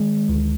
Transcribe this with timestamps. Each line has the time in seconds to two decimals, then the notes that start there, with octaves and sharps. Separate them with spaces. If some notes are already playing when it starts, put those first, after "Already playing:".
Already playing: D#3 G#3
0.29 D2